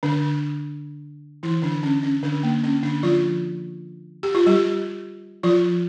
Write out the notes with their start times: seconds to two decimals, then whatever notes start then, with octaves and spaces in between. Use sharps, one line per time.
0.03 D3 D4
1.43 E3 E4
1.62 D3 D4
1.83 C#4
2.03 C#4
2.23 D3 D4
2.43 A#3
2.64 C#4
2.83 D3 D4
3.03 F3 F4
4.23 G4
4.35 F4
4.46 G3 G4
5.43 F3 F4